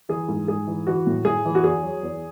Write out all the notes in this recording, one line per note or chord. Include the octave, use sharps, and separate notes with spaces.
E3 G#4
G#2
G#2 G#4
E3
E3 F#4
A2
A2 G#4
E3
F#4
E2 G#4
F#3
E2